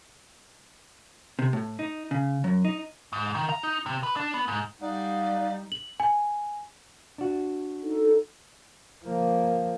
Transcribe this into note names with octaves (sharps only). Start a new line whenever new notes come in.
C3
A2
D#4
C#3
F#2
D#4
G#2
D#3
A#5
D#4
C3
B4
D4
B3
G#2
G3 D#4 D5 D#5 F5 F#5
F#7
G#5
D4 F#4
D#4 A4
F3 A#3